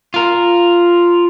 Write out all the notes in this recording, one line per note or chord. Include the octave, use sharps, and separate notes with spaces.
F4 A#4